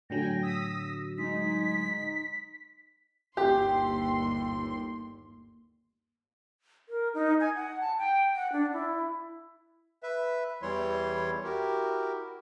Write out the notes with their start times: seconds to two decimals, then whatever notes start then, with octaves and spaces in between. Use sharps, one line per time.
0.10 A2 D3 F#3 G5 G#5 A#6
0.43 D#6 E6 B6
1.18 G#3 D#4 B6
3.37 G1 D#2 G4 C6
6.89 A#4
7.14 D#4
7.40 G#5
7.56 F#5
7.81 A5
7.98 G5
8.36 F#5
8.52 D4
8.73 E4
10.03 B4 E5
10.62 E2 E3 G3 E4 C#5 C6
11.44 E4 F#4 G4 A#4